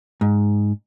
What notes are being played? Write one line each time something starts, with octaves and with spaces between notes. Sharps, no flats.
G#2